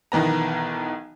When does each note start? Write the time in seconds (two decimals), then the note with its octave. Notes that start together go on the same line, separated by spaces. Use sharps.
0.12 B1 D#3 E3 B3 A#5